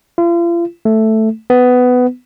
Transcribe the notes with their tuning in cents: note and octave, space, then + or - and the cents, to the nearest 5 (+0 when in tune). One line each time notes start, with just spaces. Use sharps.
F4 -40
A3 +0
B3 +15